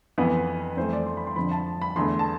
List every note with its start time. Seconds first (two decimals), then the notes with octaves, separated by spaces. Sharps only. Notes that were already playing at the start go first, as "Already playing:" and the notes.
0.18 F2 E3 B3 B4
0.77 F2 E3 A3 C5
0.93 D5
1.06 C6
1.17 B5
1.27 C6
1.36 F2 D3 F3 B5
1.51 A5
1.82 B5
1.96 E2 D3 A3 C6
2.19 A5